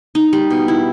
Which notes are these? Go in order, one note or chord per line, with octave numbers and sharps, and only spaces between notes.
D#4
G3
B2
E4